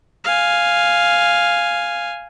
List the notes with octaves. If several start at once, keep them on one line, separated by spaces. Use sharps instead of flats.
F5 G#5